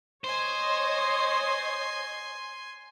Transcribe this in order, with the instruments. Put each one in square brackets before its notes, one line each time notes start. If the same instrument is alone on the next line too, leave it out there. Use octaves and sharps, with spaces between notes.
[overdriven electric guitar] C5 [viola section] C#5 D#5 [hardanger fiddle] G#5 C6